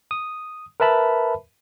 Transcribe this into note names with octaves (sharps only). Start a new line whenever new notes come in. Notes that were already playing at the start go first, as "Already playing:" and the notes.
D#6
A#4 B4 E5 A5 B5